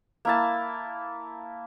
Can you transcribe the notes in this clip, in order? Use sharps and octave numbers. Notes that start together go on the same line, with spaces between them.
A#3 E4 A5